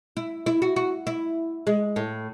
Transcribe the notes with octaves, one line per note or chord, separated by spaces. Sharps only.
E4
E4
F#4
F#4
E4
G#3
A2